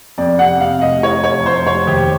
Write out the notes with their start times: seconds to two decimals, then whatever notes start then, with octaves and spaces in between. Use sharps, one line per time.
0.18 F2 D5
0.39 C3 F#5
0.60 C3 F5
0.81 F1 D#5
1.02 E3 C#5
1.24 F1 C#5
1.46 F1 C5
1.66 F1 C#5
1.87 D#2 G4